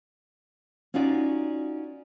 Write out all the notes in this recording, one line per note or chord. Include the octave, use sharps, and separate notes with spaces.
C#4 D#4 F4 F#4 D5